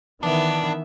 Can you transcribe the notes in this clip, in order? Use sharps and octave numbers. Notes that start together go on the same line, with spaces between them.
D#3 E3 B3 D4 E5